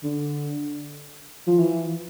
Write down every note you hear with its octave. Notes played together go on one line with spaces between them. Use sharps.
D3
F3
E3